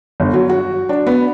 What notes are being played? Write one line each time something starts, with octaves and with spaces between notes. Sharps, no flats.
G1
F#3
F#4
D4
B3